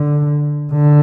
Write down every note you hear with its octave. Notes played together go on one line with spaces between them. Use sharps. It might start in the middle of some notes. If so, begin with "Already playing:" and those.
Already playing: D3
D3